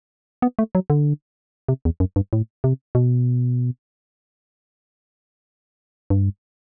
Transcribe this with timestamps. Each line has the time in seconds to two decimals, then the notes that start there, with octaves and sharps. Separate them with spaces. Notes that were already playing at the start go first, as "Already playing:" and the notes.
0.42 B3
0.59 A3
0.75 F#3
0.90 D3
1.69 C3
1.85 E2
2.00 F#2
2.16 G2
2.33 A2
2.64 C3
2.95 B2
6.10 G2